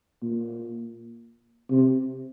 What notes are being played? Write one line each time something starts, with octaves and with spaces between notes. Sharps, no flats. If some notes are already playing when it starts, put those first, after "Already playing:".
A#2
C3